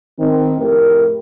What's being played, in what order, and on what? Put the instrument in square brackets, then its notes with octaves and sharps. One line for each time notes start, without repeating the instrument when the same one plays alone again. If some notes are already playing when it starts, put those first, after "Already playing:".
[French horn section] D#3 C4
F2 A2 A3 G4 A#4